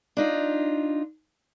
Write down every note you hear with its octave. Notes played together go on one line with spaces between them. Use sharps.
D4 D#4 F4